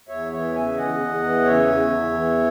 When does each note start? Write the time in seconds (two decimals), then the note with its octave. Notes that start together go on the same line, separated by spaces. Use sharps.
0.08 E2 C#5 E5
0.32 E3 C#5 E5
0.54 C#3 E5 G#5
0.77 E2 D#5 F#5
1.00 E2
1.23 E3
1.45 C#3 C#5 E5
1.68 E2
1.91 E2
2.13 E3